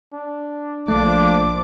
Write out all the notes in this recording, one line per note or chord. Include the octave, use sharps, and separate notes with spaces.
D4
A#1 F3 A3 D4 D6